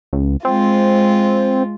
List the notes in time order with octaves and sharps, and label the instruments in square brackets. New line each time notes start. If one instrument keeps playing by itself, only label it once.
[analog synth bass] C#2
[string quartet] G#3 F4 [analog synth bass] C4